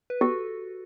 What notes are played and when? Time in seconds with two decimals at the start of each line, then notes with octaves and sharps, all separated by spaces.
0.10 B4
0.21 F#4 G4 A4